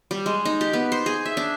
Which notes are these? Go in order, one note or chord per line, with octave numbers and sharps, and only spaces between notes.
G3
G#3
D#4
G4
B3
C5
G#4
E5
D4